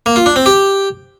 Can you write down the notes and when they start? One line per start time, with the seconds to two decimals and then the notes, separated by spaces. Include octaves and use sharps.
0.06 A#3
0.16 F4
0.26 D4
0.36 C4
0.46 G4